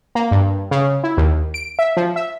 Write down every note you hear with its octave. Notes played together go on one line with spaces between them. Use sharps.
A#3
G2
C#3
E4
D#2
D7
E5
F3
E5